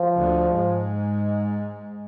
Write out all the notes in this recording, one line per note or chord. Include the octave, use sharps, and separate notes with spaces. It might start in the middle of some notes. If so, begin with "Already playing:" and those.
Already playing: F3
D2 D3
G#2 G#3